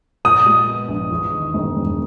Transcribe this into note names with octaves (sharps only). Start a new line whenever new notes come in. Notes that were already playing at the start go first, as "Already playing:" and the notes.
A#2 D#6
G#3
B3
A#1
E2
D#3
E1
E1